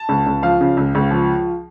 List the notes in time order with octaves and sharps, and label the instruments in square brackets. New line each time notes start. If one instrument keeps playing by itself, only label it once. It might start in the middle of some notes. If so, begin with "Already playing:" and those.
Already playing: [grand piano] A5
C#2
C#2
F3 F5
C#3
C#2
C#2
F3